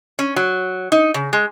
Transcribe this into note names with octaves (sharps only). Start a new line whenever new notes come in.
C#4
F#3
D#4
C#3
G#3